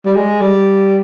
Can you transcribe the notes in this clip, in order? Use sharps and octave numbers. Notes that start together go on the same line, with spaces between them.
G3
G#3
G3